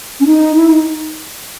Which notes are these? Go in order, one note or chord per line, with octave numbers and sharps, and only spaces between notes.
C#4
D#4
E4
D#4